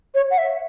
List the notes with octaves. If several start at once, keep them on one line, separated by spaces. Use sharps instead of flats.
C#5
F#5
E5